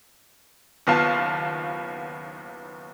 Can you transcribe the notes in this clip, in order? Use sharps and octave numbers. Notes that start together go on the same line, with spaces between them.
F#1 D#2 B3 F4 F5 A5